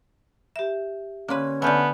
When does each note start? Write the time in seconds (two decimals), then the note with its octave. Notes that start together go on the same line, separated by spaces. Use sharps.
0.56 G4 E5
1.28 D3 A#3 C#4 B4 C6
1.62 D3 A3 B3 G#5 F6 G6